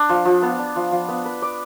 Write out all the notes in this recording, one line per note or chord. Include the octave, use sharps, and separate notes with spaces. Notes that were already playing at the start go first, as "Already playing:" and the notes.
Already playing: D4
F3
F3
B3
D4
F3
F3
B3
B4
D5